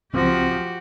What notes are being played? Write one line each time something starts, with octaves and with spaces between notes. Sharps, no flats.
C#2 F3 C4 F#4 G4